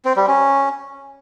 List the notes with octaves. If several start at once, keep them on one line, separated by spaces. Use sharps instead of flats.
C4
G3
C#4